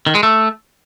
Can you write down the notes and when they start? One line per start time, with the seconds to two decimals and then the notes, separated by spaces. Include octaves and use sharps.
0.07 D#3
0.15 G#3
0.23 A3